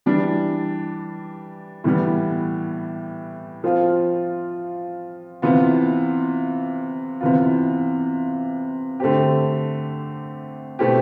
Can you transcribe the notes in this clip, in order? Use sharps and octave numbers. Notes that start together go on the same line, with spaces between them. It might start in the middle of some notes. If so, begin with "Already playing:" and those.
E3 G3 D4
A2 E3 G3 B3
F3 C4 F4
C3 E3 B3 F4
C3 E3 B3 F4
D3 A3 C4 G4
B2 A3 C4 E4 G4